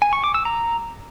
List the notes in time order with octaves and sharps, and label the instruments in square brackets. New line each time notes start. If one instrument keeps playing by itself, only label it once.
[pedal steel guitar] G#5
C#6
D6
E6
A#5